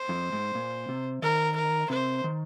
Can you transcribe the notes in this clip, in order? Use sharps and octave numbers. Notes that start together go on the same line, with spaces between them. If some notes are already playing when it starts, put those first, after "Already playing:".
Already playing: C5
F2
G#2
A#2
C3
D#3 A#4
A#4
C3 C5
D#3